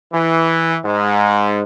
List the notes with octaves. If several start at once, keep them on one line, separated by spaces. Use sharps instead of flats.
E3
G#2